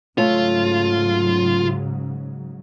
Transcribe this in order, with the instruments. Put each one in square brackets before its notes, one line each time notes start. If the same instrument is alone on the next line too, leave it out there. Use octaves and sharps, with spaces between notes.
[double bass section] G#2 C#3 F#3 [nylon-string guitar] A3 C#5 [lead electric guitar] F4